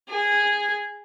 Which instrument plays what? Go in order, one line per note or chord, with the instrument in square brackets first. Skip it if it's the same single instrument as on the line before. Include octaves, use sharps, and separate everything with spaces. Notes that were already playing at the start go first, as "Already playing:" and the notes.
[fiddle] G#4